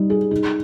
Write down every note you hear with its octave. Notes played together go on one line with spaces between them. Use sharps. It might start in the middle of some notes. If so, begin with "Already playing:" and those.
Already playing: G3 D#4
G#4
D#4